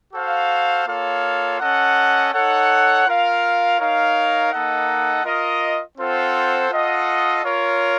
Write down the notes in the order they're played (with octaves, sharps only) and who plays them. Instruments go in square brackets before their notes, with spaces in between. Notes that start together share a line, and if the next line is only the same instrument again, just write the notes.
[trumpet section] F#4 A4 C5 F5
A#3 F4 A4 C#5 F5
C#4 A4 D#5 F#5
D#4 A4 C#5 F#5
F4 A#4 F5
D#4 A#4 C#5 F5
A#3 D#4 A4 D#5 F#5
F4 A#4 D#5
C4 F4 A4 C5 F#5
F4 A4 D#5 F#5
F4 A#4 C#5